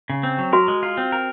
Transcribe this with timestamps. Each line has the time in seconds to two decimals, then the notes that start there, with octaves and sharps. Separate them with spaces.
0.10 C#3
0.23 C4
0.38 F#3
0.53 F#4 A#4
0.68 G#3
0.83 F4
0.97 C4
1.12 A#4